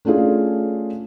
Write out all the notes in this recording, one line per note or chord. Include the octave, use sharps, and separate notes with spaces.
A3 C#4 D4 F4 G#4